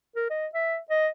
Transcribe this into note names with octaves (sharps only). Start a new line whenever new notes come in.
A#4
D#5
E5
D#5